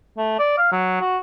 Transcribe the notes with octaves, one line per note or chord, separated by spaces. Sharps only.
A3
D5
F5
F#3
F#4